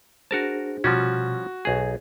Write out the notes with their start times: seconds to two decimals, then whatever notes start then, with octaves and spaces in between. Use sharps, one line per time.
0.31 D4 F#4 G#4 A#4 C5 A5
0.84 B2 F3 G3 C#4 F#4
1.65 B1 G#4 G#5